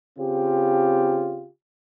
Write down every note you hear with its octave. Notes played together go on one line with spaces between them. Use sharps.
C#3 C4 F4 G4